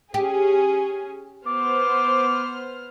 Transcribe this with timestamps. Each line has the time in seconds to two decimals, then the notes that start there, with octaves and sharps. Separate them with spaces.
0.14 C#4 G4 G#4
1.47 B3 C5 D6 F6